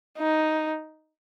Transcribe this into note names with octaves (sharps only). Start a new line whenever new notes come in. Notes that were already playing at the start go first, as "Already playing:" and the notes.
D#4